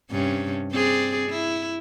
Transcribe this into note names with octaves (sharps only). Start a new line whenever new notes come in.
G2 C3 C#4
C4 G#4 D5
E4